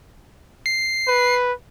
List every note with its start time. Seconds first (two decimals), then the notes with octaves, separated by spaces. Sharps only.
0.66 C7
1.08 B4